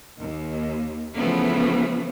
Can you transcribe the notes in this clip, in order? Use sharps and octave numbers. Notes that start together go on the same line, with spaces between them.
D#2
C#3 E3 F3 A3 B3 C#4